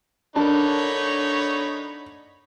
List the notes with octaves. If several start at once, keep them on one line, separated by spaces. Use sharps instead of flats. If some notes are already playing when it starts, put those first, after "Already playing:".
D3 D4 D#4 A#4 C#5 A5 B5